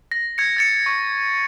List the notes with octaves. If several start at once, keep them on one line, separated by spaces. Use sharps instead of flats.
A#6
G#6 C#7
G#6 A6 C#7
C#6